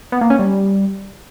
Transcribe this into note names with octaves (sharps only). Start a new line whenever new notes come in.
B3
A#3
C#4
G3